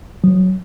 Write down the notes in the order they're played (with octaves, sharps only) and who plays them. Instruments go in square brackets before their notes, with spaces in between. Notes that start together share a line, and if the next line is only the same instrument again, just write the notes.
[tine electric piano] F#3